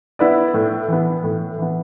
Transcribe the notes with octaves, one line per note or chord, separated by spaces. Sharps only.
B3 E4 B4 D5
A2
E3 B3
A2
E3 B3